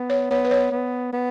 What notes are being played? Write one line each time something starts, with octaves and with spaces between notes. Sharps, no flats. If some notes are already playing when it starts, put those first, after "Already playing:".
Already playing: B3
C#5
B3 C#5
B4
C#5
B3
B3